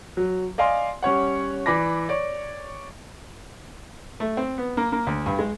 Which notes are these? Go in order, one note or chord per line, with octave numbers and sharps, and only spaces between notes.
F#3
D5 D#5 F5 G#5 C6
G3 C#4 C#5 F#5
E3 D5 B5 D6 A#6
C#5 D5
A3
C4
B3
A#3
A#3
D2
G2
G#3